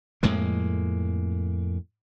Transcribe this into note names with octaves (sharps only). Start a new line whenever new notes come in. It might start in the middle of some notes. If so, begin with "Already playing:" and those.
F2 A2 G#3 A#3